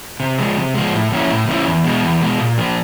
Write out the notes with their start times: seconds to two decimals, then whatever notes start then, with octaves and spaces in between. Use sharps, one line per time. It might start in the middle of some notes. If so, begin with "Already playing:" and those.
0.20 C3
0.38 F3 G#3
0.57 C3
0.74 F3 G#3
0.93 A2
1.12 F3 A#3 C#4 E4
1.30 A2
1.48 F3 A#3 C#4 E4
1.66 E2
1.84 B2 G#3
2.03 E2
2.21 B2 G#3
2.39 A#2
2.58 F3 A#3